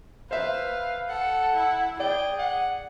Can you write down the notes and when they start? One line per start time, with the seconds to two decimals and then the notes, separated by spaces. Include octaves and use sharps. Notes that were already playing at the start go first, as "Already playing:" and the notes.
0.31 B4 C5 E5 F5
1.09 A4 F#5
1.55 E4
2.00 G#4 D5 G5
2.39 F#5